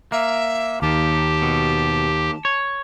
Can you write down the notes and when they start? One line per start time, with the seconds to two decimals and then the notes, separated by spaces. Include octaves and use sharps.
0.12 A#3 E5
0.82 D#2 G4 A5
1.42 B2
2.45 C#5